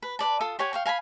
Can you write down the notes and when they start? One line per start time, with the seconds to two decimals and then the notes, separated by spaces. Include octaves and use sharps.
0.03 B4
0.19 B4 D5 A5
0.40 F4 A4 D#6
0.59 G4 C#5 F#5 G#5
0.73 F5 G5 C#6
0.86 F5 G#5 A#5 B5